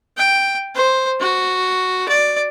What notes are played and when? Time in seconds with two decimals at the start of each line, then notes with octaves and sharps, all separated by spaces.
0.17 G5
0.75 C5
1.20 F#4
2.08 D5